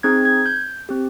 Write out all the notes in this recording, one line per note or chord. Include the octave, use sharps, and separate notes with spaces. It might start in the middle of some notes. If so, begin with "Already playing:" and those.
C4 D#4 G#4 G#6
G#6
G6
C4 G4